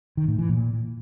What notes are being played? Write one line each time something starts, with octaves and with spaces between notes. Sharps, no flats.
D#3
A2
E3
A#2